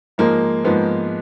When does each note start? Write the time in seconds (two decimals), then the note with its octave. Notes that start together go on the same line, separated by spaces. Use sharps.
0.18 G#2 F3 G#3 A#3
0.64 G#2 F3 G#3 B3